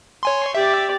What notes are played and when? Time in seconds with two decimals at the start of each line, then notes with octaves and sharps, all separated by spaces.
0.23 C#5 G#5 C6
0.55 G4 D5 E5